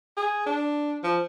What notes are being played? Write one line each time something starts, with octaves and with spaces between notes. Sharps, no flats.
G#4
D4
F3